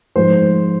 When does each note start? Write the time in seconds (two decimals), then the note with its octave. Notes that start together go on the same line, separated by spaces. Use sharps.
0.16 G#2 F3 G#3 C5